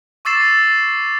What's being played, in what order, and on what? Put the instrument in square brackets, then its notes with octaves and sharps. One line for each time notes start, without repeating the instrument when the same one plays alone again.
[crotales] C#6 D6 E6 A6 C7 E7